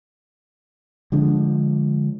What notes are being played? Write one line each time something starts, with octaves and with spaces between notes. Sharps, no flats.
D3 F3 G#3 D4